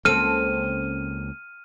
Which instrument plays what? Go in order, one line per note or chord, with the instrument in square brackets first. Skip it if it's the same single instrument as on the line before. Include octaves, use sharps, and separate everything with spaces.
[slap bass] C#2 C#3 A#3 [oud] C4 A4 [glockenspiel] F6 D#7